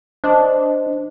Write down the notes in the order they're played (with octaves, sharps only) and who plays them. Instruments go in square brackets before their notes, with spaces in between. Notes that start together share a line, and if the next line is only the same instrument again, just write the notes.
[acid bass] D4 [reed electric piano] C5 D#5